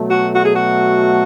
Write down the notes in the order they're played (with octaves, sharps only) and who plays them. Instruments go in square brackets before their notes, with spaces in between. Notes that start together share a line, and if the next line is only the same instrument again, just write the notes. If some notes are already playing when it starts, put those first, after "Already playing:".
Already playing: [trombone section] B2 F#3 A3
[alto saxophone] F#4
F#4
G#4
F#4